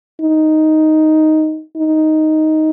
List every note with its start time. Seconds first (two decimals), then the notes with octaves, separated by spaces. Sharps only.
0.21 D#4
1.77 D#4